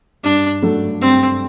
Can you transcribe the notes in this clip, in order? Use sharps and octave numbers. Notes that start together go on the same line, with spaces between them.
G2 D4
F#3 A3 D4 A4
G2 C4